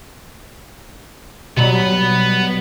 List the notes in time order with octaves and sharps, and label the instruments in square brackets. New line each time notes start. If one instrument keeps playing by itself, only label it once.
[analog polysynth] B2 F#3 G3 [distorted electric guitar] B3 B5